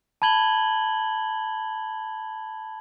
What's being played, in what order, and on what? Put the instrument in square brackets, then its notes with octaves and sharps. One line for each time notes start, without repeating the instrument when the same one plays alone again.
[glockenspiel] A5 B5 G#6 F#7 G7